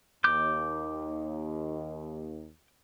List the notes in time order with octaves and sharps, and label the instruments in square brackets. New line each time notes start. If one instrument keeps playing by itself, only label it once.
[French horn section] D#2 [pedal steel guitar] D6 G6